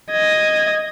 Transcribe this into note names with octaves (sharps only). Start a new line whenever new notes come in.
D#5 G#6